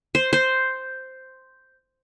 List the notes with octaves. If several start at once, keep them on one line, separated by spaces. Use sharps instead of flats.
C5
C5